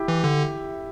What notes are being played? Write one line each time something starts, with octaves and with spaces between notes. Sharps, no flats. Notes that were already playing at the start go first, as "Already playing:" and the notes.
Already playing: E4 G4
E3
D3